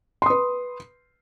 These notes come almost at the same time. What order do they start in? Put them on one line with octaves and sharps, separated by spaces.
C6 D#6 B4